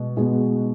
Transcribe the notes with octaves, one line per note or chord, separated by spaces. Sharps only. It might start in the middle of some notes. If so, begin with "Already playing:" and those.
Already playing: B2 G#3
B2 G#3 B3 F#4